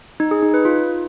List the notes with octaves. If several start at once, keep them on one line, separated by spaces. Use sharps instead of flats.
D#4
G#4
D#4
B4
F4